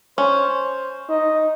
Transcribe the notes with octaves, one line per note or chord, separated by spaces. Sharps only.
C#4 C5
D#4 D#5